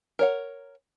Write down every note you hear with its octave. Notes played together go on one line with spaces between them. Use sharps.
A#4 C#5 F#5